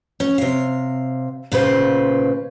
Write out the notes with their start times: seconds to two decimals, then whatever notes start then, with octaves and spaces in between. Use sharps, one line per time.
0.20 C#4
0.38 C3 F5
1.52 A#2 C#3 B4 C5 F5